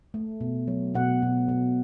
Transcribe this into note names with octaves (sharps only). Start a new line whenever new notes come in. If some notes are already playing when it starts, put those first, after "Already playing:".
A3
B2
F#3
B2 F#5
B2
B2